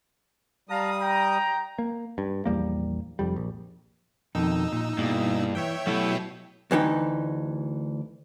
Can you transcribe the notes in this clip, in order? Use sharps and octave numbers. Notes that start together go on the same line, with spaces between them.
G3 F5 A5 A#5 D#6
G5 A#5
A#3
G2
A#1 E2 G3 A#3
F1 F2 G3
A#1
F2 B2 D#3 D#4 E6
A#2
G2 B2 A#3 E4 G#4
E3 C#5 E5 G5
B2 F#3 A3 B3 E4 G4
D2 E3 D#4 G5